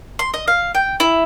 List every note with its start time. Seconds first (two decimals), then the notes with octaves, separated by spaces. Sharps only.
0.19 C6
0.34 D#5
0.48 F5
0.75 G5
1.00 E4